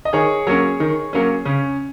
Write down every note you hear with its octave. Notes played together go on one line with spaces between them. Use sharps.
D#5
D#3 G#4 C#5
F#3 A#3 C#4
D#3
F#3 A#3 C#4
C#3 C#4